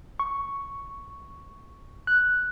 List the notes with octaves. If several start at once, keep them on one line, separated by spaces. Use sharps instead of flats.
C#6
F#6